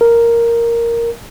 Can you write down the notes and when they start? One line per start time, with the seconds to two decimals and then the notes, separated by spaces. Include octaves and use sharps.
0.01 A#4